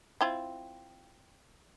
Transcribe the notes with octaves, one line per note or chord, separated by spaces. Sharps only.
C4 E4 F4